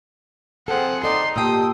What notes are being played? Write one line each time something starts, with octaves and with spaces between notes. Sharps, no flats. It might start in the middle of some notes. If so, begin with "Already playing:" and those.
F3 C4 G#4 A4 F#5
D#4 A4 D5 D#5 C6
A#2 G4 G5 A5 D#6 E6